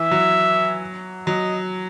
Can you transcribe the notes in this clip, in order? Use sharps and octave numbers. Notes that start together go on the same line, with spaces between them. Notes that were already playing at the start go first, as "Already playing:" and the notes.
Already playing: E3 E5
F#3
F#3 D#5